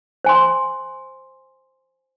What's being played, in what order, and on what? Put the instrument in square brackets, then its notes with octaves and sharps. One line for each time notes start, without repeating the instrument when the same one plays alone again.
[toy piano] C5 G#5 C6